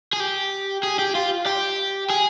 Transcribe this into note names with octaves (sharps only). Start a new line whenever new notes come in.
G#4
G4
G#4
G4
F4
G4
G#4